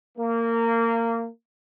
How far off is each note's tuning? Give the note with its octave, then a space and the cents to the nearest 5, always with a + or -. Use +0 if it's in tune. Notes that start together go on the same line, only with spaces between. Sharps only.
A#3 -20